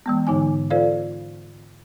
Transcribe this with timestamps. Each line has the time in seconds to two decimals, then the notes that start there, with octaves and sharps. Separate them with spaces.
0.06 E3 G#3 B3
0.27 G#2 D3 D#4 G#5
0.70 F4 A4 C5 D5 F5